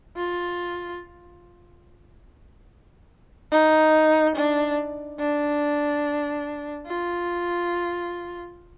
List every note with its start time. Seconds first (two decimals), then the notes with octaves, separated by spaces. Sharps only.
0.17 F4
3.51 D#4
4.36 D4
5.20 D4
6.87 F4